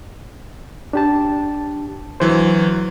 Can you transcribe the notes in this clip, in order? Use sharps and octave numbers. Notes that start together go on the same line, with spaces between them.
D4 G4 A5
D2 E3 F#3 C5